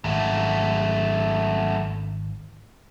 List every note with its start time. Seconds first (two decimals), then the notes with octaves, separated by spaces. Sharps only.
0.04 G#1 F#2 A3